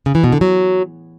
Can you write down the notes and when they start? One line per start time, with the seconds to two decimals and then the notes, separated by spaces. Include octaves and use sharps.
0.06 C#3
0.15 E3
0.24 B2
0.32 D3
0.41 F#3